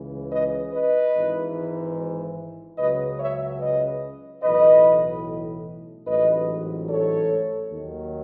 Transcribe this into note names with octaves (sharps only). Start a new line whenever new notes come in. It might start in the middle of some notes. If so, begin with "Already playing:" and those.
Already playing: C#2 C#3 E3
B4 D#5
B4 D#5
G#1 G#2 E3
C#2 C#3 F#3 B4 D#5
C#5 E5
B4 D#5
B1 A2 E3 B4 D#5
A1 G#2 F#3 B4 D#5
A4 C#5
D#2 D#3 F#3